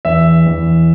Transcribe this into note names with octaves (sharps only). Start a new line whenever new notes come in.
E2 E5
E2